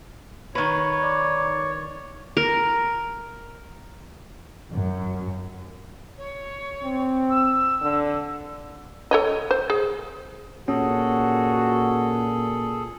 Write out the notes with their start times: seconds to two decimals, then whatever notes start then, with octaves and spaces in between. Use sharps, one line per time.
0.55 D#3 B4 C#5
1.04 D5
2.37 A#4
4.72 F#2
6.17 C#5
6.83 C4
7.30 E6
7.82 D3
9.11 A4 C#5 D#5
9.51 C5
9.70 G#4
10.68 A#2 C#4 F#4 G#4 A4